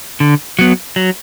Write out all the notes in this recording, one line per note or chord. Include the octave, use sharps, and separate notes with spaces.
D3
F#3 B3
F#3